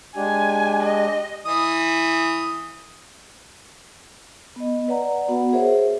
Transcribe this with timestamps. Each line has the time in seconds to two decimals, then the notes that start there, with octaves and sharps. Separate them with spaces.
0.16 G#3 D4 G4 G#5
0.83 D#5
1.46 E3 D#6
4.56 B3 D#5
4.88 B4 D5 F#5 A#5
5.28 B3 F#4 F#5
5.53 G#4 A#4 C5 C#5 E5